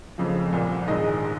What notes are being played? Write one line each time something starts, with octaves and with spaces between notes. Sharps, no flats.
F1 F2 C#3 F3
C2 A#2 F3
A#1 G#2 D#3 G#3 D#5